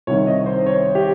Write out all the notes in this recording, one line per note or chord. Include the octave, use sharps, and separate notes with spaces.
C2 C3 D#3 C#5
D#5
C5
C#5
G4